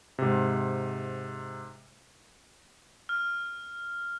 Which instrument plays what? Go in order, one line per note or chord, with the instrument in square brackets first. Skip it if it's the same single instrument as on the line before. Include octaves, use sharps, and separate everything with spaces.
[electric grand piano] G#2 C3
[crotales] F6